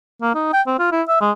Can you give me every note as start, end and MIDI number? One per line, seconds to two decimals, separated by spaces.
0.22 0.34 58
0.35 0.50 63
0.53 0.62 79
0.67 0.76 60
0.79 0.91 65
0.92 1.02 64
1.08 1.16 76
1.21 1.31 56